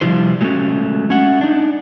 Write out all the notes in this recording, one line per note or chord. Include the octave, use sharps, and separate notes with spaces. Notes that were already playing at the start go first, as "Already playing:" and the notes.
C3 F3 G3 E4 C5
F#3 G#3 A3 B3 C#4
C#4 E5 F#5
D4 D#4